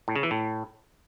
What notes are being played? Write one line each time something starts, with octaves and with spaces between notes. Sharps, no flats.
A2
C#3
E3
A2